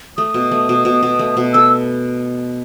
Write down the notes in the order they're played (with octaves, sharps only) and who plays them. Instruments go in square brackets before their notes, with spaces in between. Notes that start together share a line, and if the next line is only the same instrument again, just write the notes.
[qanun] A3 [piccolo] D#6
[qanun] B2
A3
B2
B2
B2
A3
B2
[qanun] A4 [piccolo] E6